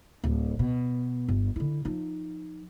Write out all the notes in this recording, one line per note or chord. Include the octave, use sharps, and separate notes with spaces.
D1
B2
G1
D3 E4
F3 D#4